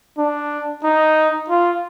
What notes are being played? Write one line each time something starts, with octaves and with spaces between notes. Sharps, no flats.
D4
D#4
F4